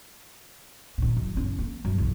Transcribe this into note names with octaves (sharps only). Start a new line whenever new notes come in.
A#2 D#3
F#2 E3
F#1 C#4
A#3
F#2
B1 E2